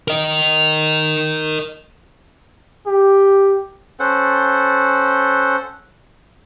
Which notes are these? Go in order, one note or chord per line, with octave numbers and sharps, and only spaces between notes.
A#4 D#5
G4
C#4 A4 C5 F#5